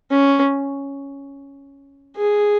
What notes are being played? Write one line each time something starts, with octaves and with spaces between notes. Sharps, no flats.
C#4
G#4